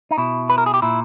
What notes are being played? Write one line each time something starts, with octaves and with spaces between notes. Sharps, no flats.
D#4
B2 E4
B4
A#4
G#4
G4
A#2 E4